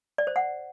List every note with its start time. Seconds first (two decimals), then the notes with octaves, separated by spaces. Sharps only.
0.18 D5
0.27 C5
0.36 F#5